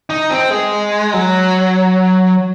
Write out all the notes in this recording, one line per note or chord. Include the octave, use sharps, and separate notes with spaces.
D#4
C4
G#3
F#3